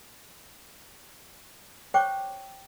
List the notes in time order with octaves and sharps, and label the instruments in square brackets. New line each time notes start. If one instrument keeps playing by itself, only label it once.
[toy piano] C5 C#5 G5 C#6 D6